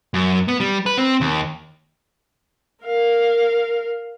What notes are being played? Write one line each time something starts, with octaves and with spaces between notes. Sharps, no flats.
F#2
B3
G3
B4
C4
D#2
A#4 F5